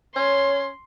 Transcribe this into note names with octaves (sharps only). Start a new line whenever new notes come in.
C#4 C#5 C6